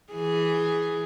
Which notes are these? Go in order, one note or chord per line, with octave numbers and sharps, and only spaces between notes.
E3 G#4